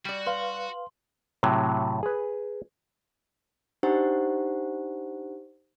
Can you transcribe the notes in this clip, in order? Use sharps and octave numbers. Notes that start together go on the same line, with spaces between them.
G3 F#4 D5
B4 F5 C6
A2 C3 F#3
G#4 B4
D4 D#4 G4 C5 F#5 A#5